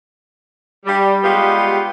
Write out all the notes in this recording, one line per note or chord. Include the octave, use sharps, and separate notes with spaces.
G3
G3 G#3 B3 F4 G4